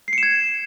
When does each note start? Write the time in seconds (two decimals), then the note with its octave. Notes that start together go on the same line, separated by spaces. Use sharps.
0.08 C7
0.13 C#7
0.18 E7
0.23 G#6